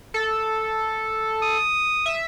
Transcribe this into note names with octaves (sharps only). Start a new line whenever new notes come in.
A4
D#6
E5